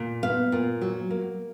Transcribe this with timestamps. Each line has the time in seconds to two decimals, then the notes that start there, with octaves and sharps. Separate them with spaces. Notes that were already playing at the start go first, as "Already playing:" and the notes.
Already playing: A#2
0.23 B3 F5
0.52 A#2
0.82 F#3
1.10 A#3